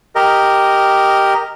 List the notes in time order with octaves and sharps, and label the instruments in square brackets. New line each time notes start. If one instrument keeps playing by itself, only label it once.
[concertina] G4 A#4 D#5